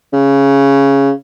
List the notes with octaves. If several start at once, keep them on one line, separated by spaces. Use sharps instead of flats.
C#3